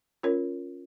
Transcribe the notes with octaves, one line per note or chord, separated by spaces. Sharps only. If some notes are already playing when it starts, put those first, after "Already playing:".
C#4 F4 A#4 C#5